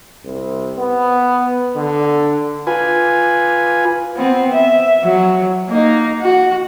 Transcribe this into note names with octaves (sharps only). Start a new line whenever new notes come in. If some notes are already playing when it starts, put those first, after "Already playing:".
C2
B3
D3
F4 B4 G#5
B3 C4
E5
F#3
A#3 D#4
F#4 F#5